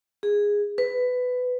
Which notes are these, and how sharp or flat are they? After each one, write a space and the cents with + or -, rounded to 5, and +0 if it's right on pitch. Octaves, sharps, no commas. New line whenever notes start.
G#4 -10
B4 +15